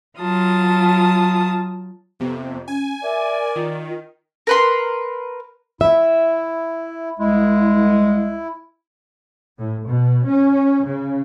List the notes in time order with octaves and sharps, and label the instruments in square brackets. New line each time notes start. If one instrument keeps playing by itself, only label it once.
[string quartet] F#3 F4 A5 D#6
[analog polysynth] F2 C3 [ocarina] B3
[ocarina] C#4 [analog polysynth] G#5
[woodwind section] A#4 D5 [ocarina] E5
[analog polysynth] D#3 [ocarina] F4
[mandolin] A#4 B4 C6
[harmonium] E4 [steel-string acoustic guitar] E5
[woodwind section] C2 G#3 [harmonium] E4
[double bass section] A2
B2
C#4
C#3